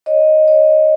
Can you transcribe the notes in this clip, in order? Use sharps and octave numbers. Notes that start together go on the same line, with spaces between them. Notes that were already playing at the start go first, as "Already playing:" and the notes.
C#5 D#5
C#5 D#5